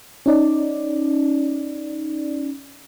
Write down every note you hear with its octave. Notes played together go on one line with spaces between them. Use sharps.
C#4 D#4 D5